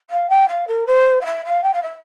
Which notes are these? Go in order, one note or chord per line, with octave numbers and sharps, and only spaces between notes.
F5
G5
F5
A#4
C5
F5
E5
F5
G5
F5
E5